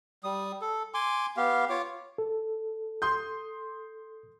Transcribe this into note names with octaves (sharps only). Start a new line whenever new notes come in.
G3 D#6
A4
G#5 C6 D6
B3 G4 F5
F4 C#5 D6
A4
C6 D#6 G6